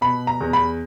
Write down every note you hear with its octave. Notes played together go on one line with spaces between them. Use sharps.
B2 B5
A#5
E2
B5